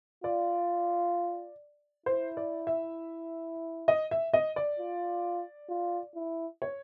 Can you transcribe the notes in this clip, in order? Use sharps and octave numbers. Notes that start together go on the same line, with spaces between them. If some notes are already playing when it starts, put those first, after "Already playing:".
F4 D5
E4 C5
D5
E5
D#5
E5
D#5
D5
F4
F4
E4
C#5